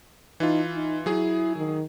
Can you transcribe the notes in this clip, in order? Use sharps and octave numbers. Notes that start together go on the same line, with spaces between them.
E3 D#4 F4
D#4
F#3 E4 G#4
D#3